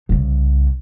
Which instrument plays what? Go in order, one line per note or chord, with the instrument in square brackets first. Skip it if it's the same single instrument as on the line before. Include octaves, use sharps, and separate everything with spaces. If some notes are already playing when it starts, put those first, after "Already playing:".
[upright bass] C2 C#3